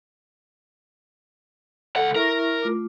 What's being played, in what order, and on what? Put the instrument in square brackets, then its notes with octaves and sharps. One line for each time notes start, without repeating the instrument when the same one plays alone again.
[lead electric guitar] C#2 F#5 [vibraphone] A4
[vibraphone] E4 E5 C#6 [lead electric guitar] A#4
[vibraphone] A3 F4 D6